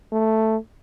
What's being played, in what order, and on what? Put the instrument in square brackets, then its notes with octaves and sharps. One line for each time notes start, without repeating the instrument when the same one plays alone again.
[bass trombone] A3